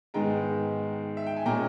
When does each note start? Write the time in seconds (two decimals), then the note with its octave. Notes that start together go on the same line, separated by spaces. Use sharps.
0.14 G#2 D#3 G#3 B3 G5 A#5
1.17 E5
1.26 G5
1.36 G#5
1.46 A#2 G#3 C#4 G5 A#5